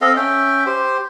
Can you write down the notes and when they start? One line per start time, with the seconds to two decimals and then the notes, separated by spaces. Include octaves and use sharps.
0.01 C4 A4 D#5 F5
0.16 C#4 E5 G5
0.66 G4 C5